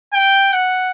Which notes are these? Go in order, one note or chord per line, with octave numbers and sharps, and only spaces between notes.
G5
F#5